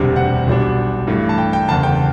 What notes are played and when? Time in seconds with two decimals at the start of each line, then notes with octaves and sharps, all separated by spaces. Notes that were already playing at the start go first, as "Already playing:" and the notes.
Already playing: E1 D2 C3 G3 D4
0.16 F#5
0.47 B1 B2 G3 D4
1.07 G2 E3 A3
1.29 A5
1.38 G5
1.53 G5
1.68 F#1 E2 D3 A5
1.83 G5